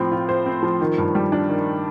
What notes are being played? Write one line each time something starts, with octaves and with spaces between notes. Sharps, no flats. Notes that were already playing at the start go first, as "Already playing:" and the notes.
Already playing: A2 F3 C4
F4
C5
C4
F3
D#3
G2
G3
D4
D#3